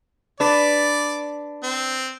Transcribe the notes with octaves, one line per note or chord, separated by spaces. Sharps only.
D4 B4 D5
C4